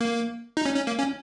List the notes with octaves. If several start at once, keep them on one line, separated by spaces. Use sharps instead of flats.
A#3
D#4
C#4
C#4
A#3
C#4